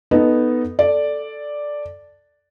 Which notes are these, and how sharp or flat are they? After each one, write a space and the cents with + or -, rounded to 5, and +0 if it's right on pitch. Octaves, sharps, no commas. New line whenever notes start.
B3 +0 D#4 +0 A4 +0
A4 +0 D5 +0